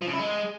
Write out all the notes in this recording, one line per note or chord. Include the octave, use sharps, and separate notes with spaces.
F3
C#3
E4
G#3